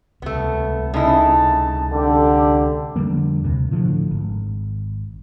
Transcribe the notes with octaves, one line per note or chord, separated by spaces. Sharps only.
C#2 C3 A3 B3
C#3 D#4 E4 A5
D3 G4
F2 D3 G3 A#3
D2 C3
A2 D3 F3
G#1